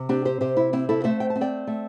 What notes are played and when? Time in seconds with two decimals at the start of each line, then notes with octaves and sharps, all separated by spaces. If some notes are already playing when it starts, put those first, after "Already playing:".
Already playing: C3
0.09 C4 D4 G4
0.25 G4 C5
0.41 C3 G4 C5
0.57 E4
0.73 C4 E4
0.89 E4 A4
1.04 A3 C5 E5
1.20 G5
1.30 A5
1.36 C4
1.41 D5 G5
1.67 A3